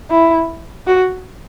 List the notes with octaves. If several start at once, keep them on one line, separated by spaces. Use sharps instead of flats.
E4
F#4